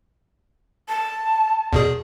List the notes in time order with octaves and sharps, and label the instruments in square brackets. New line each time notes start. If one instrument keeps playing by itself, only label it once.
[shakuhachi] A5
[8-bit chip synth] E2 B2 G#4